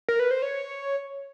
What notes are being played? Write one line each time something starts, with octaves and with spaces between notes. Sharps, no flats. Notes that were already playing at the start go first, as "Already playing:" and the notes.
A#4
B4
C5
C#5